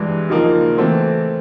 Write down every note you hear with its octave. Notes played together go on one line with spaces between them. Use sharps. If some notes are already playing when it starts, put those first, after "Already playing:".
Already playing: G2 E3 G#3
D#2 C#3 F3 A#3 D#4
E3 A3 C4